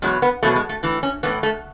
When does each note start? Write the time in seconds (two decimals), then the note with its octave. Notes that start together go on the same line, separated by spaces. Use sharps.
0.02 E2 B2 F#3 G#3
0.22 B3
0.43 E2 B2 F#3 A3
0.56 G#3
0.69 A3
0.83 A2 E3
1.03 C#4
1.23 A2 E3 B3
1.43 A3